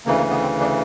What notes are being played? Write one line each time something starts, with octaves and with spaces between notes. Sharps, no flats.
D2 C#3 E3 A#3
A#3
B3
C4
D4